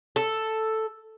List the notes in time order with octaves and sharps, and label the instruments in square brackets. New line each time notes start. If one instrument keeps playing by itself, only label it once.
[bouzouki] A4